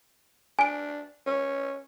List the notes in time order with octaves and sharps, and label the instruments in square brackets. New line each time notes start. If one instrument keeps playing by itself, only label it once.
[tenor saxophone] D4 [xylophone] G#5 D7
[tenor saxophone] C#4